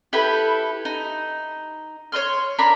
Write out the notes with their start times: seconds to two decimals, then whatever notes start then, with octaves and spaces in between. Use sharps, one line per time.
0.13 E4 G4 A4 B4
0.85 D#4
2.12 C#5 D#5 C6 F6
2.58 D4 A#4 A#5 B5